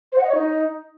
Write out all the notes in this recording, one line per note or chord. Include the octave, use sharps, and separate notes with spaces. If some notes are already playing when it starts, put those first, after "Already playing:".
C5
F#5
D#5
C#5
D#4